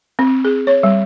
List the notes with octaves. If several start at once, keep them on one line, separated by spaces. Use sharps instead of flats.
C4
G#4
C#5
G3